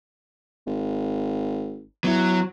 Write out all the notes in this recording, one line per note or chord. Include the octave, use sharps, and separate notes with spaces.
G#1
F#3 B3 E4